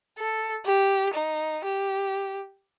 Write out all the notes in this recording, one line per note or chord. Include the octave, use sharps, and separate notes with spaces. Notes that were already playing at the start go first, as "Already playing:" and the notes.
A4
G4
D#4
G4